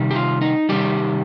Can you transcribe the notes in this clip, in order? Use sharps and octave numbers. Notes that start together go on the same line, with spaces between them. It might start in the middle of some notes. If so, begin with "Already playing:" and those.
Already playing: C3 D#3 G3
G4
F4
D#4
C3 D#3 G3 G4